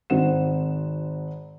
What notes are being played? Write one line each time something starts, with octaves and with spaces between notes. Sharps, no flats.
G#1 C4 D#4 F#4 F#5 E7